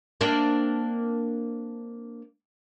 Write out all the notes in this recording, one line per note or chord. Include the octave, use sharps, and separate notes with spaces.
A#3 C4 D4